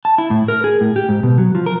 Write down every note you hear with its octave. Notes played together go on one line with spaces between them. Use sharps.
A5
E4
A2
A#4
G#4
A2
G4
G#2
B2
F#3
F3
A#4